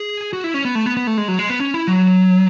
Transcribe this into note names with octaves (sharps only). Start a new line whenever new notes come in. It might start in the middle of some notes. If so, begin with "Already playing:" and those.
Already playing: G#4
F#4
E4
C#4
B3
A3
B3
B3
A3
G#3
F#3
G#3
B3
C#4
E4
F#3